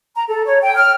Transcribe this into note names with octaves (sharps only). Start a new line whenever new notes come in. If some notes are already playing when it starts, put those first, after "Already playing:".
A#5
A4
C#5
G5
F6